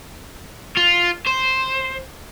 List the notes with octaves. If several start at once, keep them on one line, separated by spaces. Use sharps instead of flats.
F4
C5